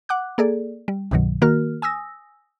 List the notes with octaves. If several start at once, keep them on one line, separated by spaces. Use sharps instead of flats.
F#5 D6 F#6
A#3 G#4 A4 D5
G3
C2 G2 B2 D#3 F#3
D#3 A#3 F#4 A#4 F6
G#5 D#6 E6 A#6